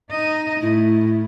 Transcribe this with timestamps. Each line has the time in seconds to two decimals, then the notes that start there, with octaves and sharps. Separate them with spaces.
0.10 D#4 D#5
0.61 A2 E4